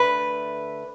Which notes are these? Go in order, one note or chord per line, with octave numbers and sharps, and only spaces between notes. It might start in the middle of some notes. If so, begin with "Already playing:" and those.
Already playing: D3 A3 B4